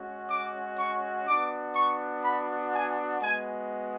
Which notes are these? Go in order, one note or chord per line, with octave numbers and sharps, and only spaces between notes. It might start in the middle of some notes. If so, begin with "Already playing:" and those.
Already playing: G#3 C#4 F#4
D6
C#6
B3 D4 F#4 D6
C#6
B5
G#5
G#3 B3 F#4 G#5